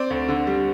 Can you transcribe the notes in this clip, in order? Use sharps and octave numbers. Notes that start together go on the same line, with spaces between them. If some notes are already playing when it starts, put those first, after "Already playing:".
Already playing: C4 D5
D2
D3
G3